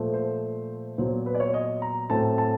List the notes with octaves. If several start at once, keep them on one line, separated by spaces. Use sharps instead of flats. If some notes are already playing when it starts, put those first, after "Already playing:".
Already playing: A#2 F3 A3
C5
A#2 F#3 B3 C5
B4
D5
C#5
D#5
A#5
A2 F#3 A3 C4 A5
A5